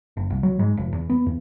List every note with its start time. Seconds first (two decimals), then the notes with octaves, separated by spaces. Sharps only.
0.17 F#1
0.30 C2
0.43 F#3
0.59 G#2
0.77 F1
0.93 E2
1.10 B3
1.26 E2